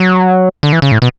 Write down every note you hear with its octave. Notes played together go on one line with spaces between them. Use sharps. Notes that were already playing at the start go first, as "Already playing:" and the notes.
Already playing: F#3
D3
E3
C#3
A2
B2